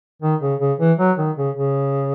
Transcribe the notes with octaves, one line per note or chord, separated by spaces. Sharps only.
D#3
C#3
C#3
E3
F#3
D#3
C#3
C#3